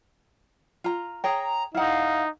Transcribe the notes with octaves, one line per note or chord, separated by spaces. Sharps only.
F4 A#5
G#4 C#5 G5 A#5
D#4 E4 F5 F#5